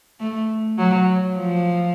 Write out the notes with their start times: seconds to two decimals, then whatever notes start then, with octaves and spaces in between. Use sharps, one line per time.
0.20 A3
0.78 F#3
1.36 F3